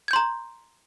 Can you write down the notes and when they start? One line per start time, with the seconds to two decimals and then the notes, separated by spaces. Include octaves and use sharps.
0.08 G#6
0.11 G6
0.13 C6
0.16 A#5